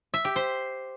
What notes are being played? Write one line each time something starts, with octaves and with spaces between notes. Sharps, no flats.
E5
G4
C5